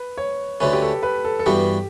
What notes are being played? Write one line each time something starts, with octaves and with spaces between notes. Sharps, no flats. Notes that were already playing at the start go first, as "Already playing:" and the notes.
Already playing: B4
C#5
D2 D3 A3 C#4 B4
G4
A4
B4
A4
A4
G2 E3 B3 F#4 G4